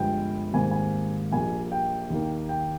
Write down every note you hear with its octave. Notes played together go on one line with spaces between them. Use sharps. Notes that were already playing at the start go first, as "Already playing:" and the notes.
Already playing: G1 G2 F3 G#3 G5
G#1 G#2 G3 A#3 G#5
G#5
A#1 A#2 G3 A#3 G#5
G5
D#2 D#3 A#3
G5